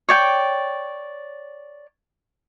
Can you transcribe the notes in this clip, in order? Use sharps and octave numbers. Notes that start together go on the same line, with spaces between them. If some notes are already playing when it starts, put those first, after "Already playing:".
C#5 D5 G5